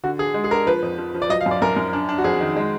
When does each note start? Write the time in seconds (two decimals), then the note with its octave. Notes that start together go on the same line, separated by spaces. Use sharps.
0.04 D3 F#4
0.19 D4 G#4
0.34 G#3
0.44 G#4
0.51 D4 A#4
0.67 F3 B4
0.83 F2
0.98 F3
1.15 F3
1.22 D5
1.29 F#3 D#5
1.41 F5
1.46 F#2
1.51 D5
1.62 F#2 A#4
1.77 F#2
1.93 D4
2.09 D4
2.18 F#4
2.24 F2 G#4
2.41 D#3
2.56 G#3